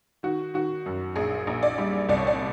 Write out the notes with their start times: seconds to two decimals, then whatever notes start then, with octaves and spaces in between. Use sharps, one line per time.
0.23 D#3 F#4
0.54 D#3 F#4
0.86 F#2
1.16 A#1 G#4
1.47 A#1
1.63 D5
1.78 G3
2.09 C2 D5
2.18 C#5
2.27 D5